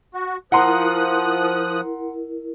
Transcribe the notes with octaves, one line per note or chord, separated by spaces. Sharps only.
F#4
F3 E4 A#4 F#5 A#5 C6 D#6 F#6